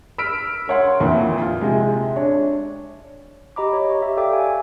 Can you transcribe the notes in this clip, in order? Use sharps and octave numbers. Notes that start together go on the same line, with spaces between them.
E6 F6 B6 D7
A#4 C#5 F#5 C6
F2 A#2 E3
F4
C3 G#3
D4 C#5
G4 D#5 A#5 B5 D6
C#5
C#6
G4 E5
A4 D5 F5 G5 D6
F5 G#5